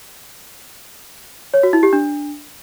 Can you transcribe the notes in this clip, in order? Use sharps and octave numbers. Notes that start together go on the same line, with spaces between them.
C#5
F#4
E4
G4
D4